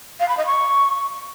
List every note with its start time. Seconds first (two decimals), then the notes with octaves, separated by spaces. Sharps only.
0.20 F5
0.29 B5
0.37 D#5
0.46 C#6